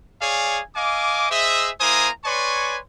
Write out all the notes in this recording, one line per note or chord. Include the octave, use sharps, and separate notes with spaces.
G#4 C#5 D5 F5 G#5
D#5 F5 G#5 D6
G#4 C5 D#5 E5
A#3 E4 C5 G#5 A#5 D#6
B4 C#5 D5 G#5 C6 C#6